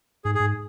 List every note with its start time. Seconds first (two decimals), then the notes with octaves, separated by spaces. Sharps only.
0.24 G#2 G#4
0.35 G#2 G#4